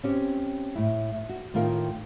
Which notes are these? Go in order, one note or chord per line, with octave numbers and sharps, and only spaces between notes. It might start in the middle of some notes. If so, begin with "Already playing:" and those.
C4 C#4 G4
A2 E4
F#4
A2 D#3 F4 A#4 G5